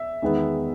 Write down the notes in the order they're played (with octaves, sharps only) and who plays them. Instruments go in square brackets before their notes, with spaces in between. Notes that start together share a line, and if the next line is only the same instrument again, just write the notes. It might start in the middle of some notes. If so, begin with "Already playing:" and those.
Already playing: [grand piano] E5
E2 D#3 G#3 B3